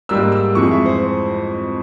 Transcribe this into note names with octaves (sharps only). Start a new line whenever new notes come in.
G#2 G3 A#3 E6
E6
F2 E3 G#3 C#6
E5
C5